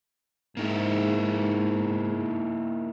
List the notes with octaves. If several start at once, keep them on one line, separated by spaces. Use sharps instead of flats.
G#2 A#3 D#4 E4